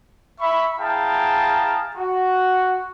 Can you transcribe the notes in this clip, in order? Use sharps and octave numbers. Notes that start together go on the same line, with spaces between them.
E5 B5 C#6
E4 G#4 F5 G5 A5 A#5
F#4